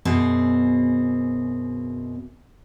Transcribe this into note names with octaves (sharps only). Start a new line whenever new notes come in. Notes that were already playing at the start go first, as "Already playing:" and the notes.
F#2 B2 C4 G#4